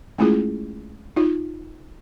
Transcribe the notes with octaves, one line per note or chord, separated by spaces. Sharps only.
G#3 A3 C#4 E4 F4 G#4
D#4 F4